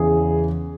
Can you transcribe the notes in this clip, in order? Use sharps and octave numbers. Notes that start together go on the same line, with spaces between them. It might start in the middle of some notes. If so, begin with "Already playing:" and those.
Already playing: E2 C#3 E3 G#4